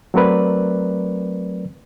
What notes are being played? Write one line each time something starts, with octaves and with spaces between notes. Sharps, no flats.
F#3 A3 C4 A#4 B4 D5